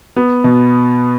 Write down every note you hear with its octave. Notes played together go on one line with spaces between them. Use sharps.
B3
B2